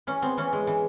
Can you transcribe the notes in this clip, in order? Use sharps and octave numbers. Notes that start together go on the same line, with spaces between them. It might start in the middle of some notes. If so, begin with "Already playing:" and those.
E3 C#4
B3 C4
E3 C#4
G#3
E3